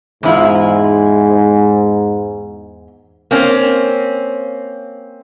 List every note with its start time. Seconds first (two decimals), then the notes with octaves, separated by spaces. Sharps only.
0.23 E2 G#2 E4 F4
3.31 A#3 C4 C#4